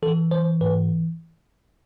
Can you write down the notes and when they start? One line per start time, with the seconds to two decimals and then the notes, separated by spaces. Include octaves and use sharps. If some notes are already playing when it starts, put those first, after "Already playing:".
0.02 E3 A4
0.31 E3 C5
0.61 G#2 B4